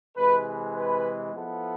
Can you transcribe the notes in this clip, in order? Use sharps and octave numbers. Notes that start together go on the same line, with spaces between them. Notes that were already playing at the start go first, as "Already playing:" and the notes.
C3 E3 G#3 B4
B4
F3 B3 E4 A4